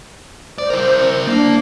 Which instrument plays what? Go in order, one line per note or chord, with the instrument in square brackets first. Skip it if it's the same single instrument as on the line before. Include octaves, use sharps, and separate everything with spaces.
[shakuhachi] C5 [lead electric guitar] D5
[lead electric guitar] E4 A#4
[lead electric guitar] A#3 [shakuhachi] D4